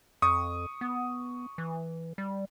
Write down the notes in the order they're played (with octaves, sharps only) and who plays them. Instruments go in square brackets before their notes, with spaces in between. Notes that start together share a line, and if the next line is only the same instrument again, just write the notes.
[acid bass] F2 [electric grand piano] C#6 D#6
[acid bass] B3
E3
G3